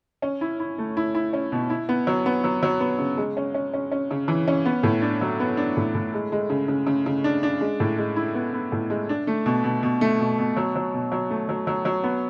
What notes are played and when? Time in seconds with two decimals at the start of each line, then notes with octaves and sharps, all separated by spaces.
0.22 C#4
0.41 E4
0.60 E4
0.78 A3
0.97 E4
1.15 E4
1.33 C#4
1.52 B2
1.70 E4
1.89 B3
2.07 F#3
2.26 B3
2.44 F#3
2.63 F#3
2.80 B3
2.99 C#3
3.17 G#3
3.37 C#4
3.54 C#4
3.74 C#4
3.92 C#4
4.11 C#3
4.28 E3
4.48 C#4
4.66 B3
4.83 A2
5.02 D4
5.21 F#3
5.40 B3
5.57 D4
5.77 A2
5.95 A2
6.14 G#3
6.32 G#3
6.50 C#3
6.68 C#3
6.87 C#3
7.06 C#3
7.24 D4
7.43 D4
7.61 G#3
7.80 A2
7.98 G#3
8.16 E4
8.35 B3
8.54 B3
8.72 A2
8.90 G#3
9.09 D4
9.27 A3
9.46 B2
9.64 B2
9.83 B2
10.01 A3
10.19 B2
10.39 B2
10.57 F#3
10.75 F#3
10.94 B2
11.12 F#3
11.30 A3
11.49 F#3
11.67 F#3
11.85 F#3
12.04 B3